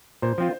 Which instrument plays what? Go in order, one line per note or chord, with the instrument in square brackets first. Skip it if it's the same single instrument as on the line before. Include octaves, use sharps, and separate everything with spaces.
[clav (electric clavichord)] A#2 [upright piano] C5
[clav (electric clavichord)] F3 C4 F4